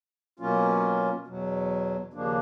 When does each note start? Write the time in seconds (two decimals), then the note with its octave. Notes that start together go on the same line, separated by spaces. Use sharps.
0.39 B2 F#3 A#3 C#4 F4
1.27 E2 B2 F#3
2.13 D#2 C#3 F3 A#3 D4